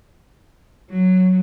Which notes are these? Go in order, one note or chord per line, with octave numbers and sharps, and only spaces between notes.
F#3